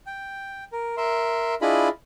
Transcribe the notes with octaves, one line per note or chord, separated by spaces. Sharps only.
G5
A#4
A#4 E5 C6
D4 E4 F4 G#4 D#5 B5